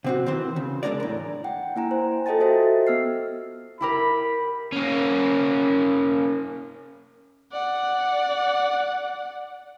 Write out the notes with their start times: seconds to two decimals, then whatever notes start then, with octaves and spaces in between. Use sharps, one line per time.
0.04 C3 C4 F#4
0.26 D#3 E3 C4 C5
0.56 C#3
0.83 E2 G#3 D4 A#4 D5
1.00 A2 A#5
1.44 F#5 G5
1.76 A#3 E4 G#5 A#5
1.91 C5
2.26 F4 A4 D#5 G5 A5 A6
2.40 F#4 A4 C5 D#5 E5
2.87 B3 E6 F6 C7
3.81 E4 G4 A#4 B5
4.72 A#3 C#4
7.53 D5 F#5